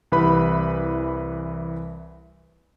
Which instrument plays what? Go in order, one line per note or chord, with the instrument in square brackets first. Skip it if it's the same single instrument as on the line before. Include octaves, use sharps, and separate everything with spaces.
[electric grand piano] C2 E3 B4 B5